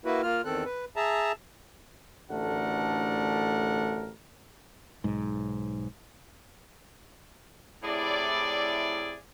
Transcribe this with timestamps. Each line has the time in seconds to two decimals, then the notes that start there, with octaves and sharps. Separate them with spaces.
0.05 A#3 E4 F#4 B4
0.23 A#3 F4 F6
0.45 E2 D#3 C4 A4 F#6
0.65 B4
0.96 G#4 E5 A5 A#5
2.30 A1 D2 A3 D4 A#4 F#5
5.04 B1 G#2
7.83 A2 C3 E4 G#4 D5